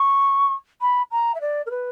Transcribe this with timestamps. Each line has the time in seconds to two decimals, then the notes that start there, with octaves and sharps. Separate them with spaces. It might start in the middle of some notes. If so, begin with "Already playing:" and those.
Already playing: C#6
0.81 B5
1.11 A#5
1.34 E5
1.41 D5
1.66 A#4
1.70 B4